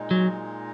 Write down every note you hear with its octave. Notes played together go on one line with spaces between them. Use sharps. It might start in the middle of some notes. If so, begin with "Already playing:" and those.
Already playing: A#2 G#3 D#4
F#3